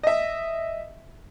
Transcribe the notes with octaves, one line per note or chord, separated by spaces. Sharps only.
D#5 E5